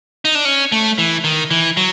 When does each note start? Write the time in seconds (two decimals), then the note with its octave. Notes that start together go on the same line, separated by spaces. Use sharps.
0.25 D#4
0.35 D4
0.45 C#4
0.72 A3
0.98 E3
1.24 D#3
1.51 E3
1.77 F#3